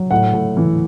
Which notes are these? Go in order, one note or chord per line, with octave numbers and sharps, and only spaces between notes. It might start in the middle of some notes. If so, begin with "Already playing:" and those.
Already playing: F#3
A2 F#5
A2
E3